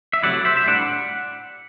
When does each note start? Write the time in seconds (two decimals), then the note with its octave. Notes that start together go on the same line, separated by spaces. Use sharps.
0.13 E5
0.23 C3 F#3 A3 E4 D5 F#5
0.45 C5 E5
0.57 E5
0.66 A2 G3 D4 D5 F#5